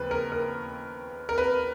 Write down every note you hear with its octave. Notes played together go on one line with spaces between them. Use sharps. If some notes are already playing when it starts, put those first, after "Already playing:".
Already playing: D#2 C#3 F3 B4
A#4
A#4
A#4
B4